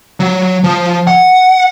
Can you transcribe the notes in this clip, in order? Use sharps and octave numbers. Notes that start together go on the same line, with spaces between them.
F#3
F3
F#5